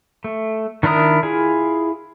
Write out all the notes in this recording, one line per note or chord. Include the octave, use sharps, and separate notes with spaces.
A3
D#3 D4 E4 A#4 D#6
E4 F4 G#4